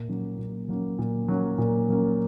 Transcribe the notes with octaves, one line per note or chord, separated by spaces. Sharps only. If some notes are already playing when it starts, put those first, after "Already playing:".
Already playing: A#2
F#3 A#3 C#4
A#2
F#3 A#3 C#4
A#2
F#3 A#3 C#4
A#2
F#3 A#3 C#4